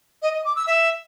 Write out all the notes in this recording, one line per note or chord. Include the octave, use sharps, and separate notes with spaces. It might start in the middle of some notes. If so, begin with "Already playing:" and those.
D#5
D#5
D6
E6
E5